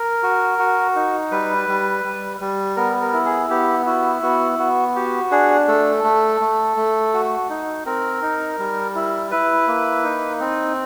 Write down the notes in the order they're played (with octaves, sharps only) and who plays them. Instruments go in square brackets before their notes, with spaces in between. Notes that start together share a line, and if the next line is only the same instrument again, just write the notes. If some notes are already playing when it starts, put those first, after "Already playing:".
Already playing: [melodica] A#4
F#4
F#4
D#4
G3 B4
G3
G3
G3
B3 A#4
A#4
E4
G#4
B3 G4
E4 F#4
B3 F#4
B3 F#4
F#4 G4
D4 G#4
A3 A4
A3
A3
A3
F#4
D#4
C4 A#4
D#4
G3
E4
E4 B4
A#3
D#4
C4